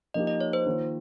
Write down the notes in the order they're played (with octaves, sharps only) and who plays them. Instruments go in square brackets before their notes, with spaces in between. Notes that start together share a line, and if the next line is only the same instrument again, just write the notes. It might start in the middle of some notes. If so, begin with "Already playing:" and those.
[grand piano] F3 A#3 D#4 G4 [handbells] D#5
[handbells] D#5
C#5
C5
[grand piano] D#3 A#3 F4